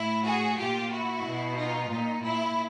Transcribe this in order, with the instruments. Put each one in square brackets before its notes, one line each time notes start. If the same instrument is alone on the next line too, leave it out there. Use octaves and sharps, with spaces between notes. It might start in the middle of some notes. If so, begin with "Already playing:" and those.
Already playing: [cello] A2 [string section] E4
[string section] F#4 G#4
[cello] A#2 [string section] F4 G4
[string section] E4 F#4
[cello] B2
[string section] D#4 F4
[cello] A#2 [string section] D#4
[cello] A#2 [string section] E4